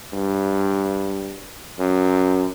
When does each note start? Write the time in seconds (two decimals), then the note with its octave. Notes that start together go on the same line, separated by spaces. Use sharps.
0.14 G2
1.79 F#2